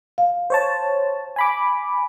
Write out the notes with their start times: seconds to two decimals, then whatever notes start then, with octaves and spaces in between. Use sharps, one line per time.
0.18 F5
0.50 C5 C#5 A5
1.36 G#5 B5 D6